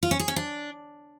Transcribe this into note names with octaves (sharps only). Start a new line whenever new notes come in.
F4
C#4
G#4
C#4
D4